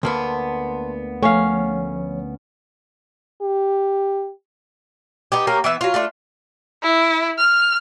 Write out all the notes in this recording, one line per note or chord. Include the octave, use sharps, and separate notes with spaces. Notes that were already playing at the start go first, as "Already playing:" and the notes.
D2 A#3 B3 A5 C6
F3 A3 C#4 C#5 F5
G4
B3 D#4 G4
A#3 C#4 G4 A#4
E3 B3 E5
F#3 F4
A3 D4 F4
E4
F6